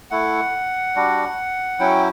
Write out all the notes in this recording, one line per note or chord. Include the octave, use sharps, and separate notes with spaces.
A3 E4 F#5
G3 D4 F#4
F#3 C#4 E4 G5